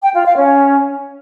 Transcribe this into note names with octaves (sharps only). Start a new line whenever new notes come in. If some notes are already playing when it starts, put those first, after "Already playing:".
G5
F4
F5
C#4